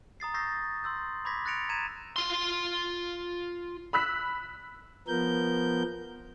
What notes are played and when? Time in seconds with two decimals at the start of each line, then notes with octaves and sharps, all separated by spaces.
0.20 A#5 D#6 A6 C7
0.34 C#6 E6 G6 A6 A#6 C7
0.84 C6 E6 G6
1.25 B5 C6 D6 G#6 A#6 B6
1.46 F#6 A6 A#6 C#7 D7 F7
1.69 A#5 G#6 B6 D#7 E7
2.16 F4 C6
3.93 B5 E6 F#6 B6
5.08 F3 B3 A#4 G6